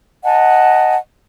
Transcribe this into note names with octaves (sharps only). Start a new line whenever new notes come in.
D#5 F#5 G#5 A5